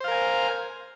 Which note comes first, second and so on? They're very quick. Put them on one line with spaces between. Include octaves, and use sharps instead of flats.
C5 F5 A#4 G#5